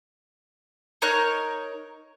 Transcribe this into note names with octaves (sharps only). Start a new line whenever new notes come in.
D#4 A#4 C#5 F#6